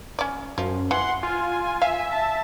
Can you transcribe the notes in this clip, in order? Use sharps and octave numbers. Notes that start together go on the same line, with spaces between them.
C#4 D5
F#2 F3
E3 F#5 C6
F4 G#5
E5 F5
A5